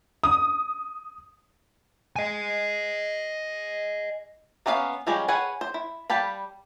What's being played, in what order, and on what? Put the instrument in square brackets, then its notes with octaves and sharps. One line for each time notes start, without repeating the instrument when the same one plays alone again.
[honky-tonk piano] D#6
[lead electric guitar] D#5 G#5
[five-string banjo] A#3 B3 C#4 A#4 F5
F3 G3 G#3 C#4
G#4 B4 C#5 F#5 G#5
C5
E4
G3 F5 G5 A5 B5